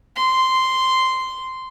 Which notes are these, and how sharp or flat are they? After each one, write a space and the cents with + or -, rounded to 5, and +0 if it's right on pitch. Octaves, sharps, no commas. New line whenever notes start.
C6 -10